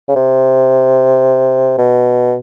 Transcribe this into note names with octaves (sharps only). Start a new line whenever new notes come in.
C#3
C3
B2